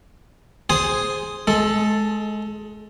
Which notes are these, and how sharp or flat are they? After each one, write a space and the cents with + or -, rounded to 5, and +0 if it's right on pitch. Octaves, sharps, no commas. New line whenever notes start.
G#4 +0 C5 +0 G#5 +0
G#3 +25 A4 +0